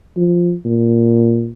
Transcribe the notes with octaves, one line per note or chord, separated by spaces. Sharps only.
F3
A#2